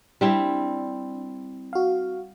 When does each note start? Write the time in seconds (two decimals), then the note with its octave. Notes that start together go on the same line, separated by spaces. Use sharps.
0.21 G3 C4 D4 E4
1.73 F#4 F5